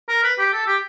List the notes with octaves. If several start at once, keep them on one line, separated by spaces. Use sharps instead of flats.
A#4
B4
G4
A4
G4